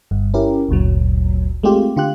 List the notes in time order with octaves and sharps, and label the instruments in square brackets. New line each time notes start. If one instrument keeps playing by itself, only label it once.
[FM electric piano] G1 G2
C#4 E4 G4 A#4
G1 D2 A#2 F#3
G#3 A3 C4 F4 G4
D3 F4 G4 F#6